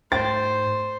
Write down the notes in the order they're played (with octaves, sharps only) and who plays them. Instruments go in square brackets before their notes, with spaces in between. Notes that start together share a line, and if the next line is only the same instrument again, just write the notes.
[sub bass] G#2 [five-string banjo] A3 G5 [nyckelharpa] C5 [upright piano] A6